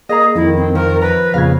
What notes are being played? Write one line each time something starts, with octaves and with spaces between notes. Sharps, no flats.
A#3 G#4 D#5 A#5
F2 D#3 E4
C4
F3 A#4
B4 A#5
F2 A#2 C#3 F5 G#6